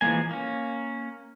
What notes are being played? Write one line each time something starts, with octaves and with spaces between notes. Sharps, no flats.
E3 F3 G#3 A#3 G#5
A#3 C#4